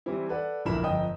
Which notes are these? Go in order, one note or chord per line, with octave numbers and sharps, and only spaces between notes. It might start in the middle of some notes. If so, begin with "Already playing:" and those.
E3 G3 C4 E4
A4 B4 D5 F#5
D1 A#1 E4 A#4 B5 E7
G1 F2 D#5 G5 D#6